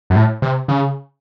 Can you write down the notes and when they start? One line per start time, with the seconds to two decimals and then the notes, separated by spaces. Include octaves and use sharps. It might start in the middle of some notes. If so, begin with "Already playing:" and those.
0.10 F#2
0.16 A2
0.42 C3
0.68 C#3